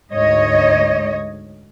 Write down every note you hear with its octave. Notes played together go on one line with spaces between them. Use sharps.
D2 G#2 C#5 D#5